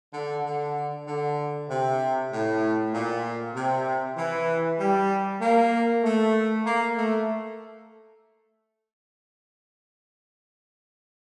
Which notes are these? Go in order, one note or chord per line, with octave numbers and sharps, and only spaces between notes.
D3
D3
D3
C3
A2
A#2
C3
E3
G3
A#3
A3
A#3
A3